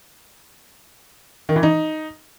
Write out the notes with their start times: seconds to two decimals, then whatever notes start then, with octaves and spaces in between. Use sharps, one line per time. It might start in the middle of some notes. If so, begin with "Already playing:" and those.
1.49 D#3
1.56 E3
1.63 D#4